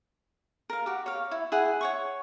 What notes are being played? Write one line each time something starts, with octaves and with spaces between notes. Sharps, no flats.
A#4 F5
F#4 G4
C#5 F5
E4
E4 G#4 F#5 G5
C#5 F#5 C#6